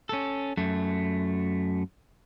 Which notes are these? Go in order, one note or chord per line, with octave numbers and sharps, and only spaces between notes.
C#4 A4
F#2 A3